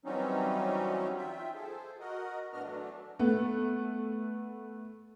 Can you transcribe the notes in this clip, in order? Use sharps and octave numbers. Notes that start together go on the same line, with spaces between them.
E3 F#3 G3 C4 C#4 D#4
F4 E5 G5
G#4 A4 C5
F#4 A#4 D#5
A2 B3 D4 F#4 D#5 F6
E3 F#3 A3 D4
A3 B3